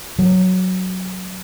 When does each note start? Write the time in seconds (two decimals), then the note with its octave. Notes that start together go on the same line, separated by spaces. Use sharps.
0.19 F#3